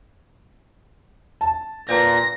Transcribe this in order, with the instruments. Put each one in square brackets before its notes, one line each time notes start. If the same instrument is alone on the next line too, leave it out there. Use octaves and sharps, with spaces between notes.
[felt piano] A5
[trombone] A#2 [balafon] B4 C5 G5 [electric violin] A#6